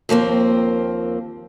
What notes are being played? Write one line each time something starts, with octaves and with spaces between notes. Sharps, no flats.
D#2 F3 A#3 C4